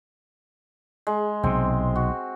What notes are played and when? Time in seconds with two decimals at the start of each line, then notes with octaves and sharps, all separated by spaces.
1.07 G#3
1.43 B1 C3 C4
1.96 F#4